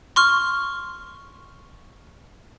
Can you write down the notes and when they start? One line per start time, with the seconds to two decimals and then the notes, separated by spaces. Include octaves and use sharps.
0.16 C6 C#6 F6